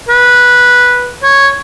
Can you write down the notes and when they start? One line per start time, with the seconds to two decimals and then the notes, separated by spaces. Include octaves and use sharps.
0.09 B4
1.23 C#5